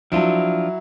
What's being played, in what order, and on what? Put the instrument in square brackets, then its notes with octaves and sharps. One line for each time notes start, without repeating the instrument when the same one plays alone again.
[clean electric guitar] F3 D4 F4 [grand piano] F#3 E4